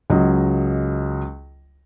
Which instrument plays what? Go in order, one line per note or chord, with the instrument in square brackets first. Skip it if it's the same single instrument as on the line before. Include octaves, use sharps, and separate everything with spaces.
[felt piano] C#2 F#3 D#5